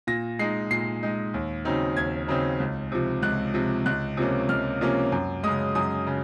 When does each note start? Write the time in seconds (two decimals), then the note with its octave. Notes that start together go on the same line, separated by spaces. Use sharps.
0.07 A#2 A#6
0.39 G#3 D#4 C7
0.71 A#2 C7
1.03 G#3 D#4
1.34 D#2
1.65 C#3 F#3 C4 D#4
1.97 D#2 G#6
2.28 C#3 F#3 C4 D#4
2.60 C#2
2.92 C3 F3
3.23 C#2 F#6
3.54 C3 F3
3.86 C#2 F#6
4.17 C3 F3 A#3 C#4
4.49 C#2 F6
4.81 C3 F3 A#3 C#4
5.12 F#2
5.43 C#3 G#3 D#6
5.75 F#2 D#6
6.07 C#3